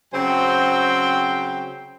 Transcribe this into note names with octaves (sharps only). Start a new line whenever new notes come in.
C#3 F#3 C4 C5 G5